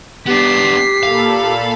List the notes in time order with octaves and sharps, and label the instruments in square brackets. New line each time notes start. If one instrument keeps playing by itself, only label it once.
[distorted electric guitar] B3 D4 [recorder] G4 [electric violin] B6 C7
[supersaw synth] A#2 A4 B5 [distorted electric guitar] F5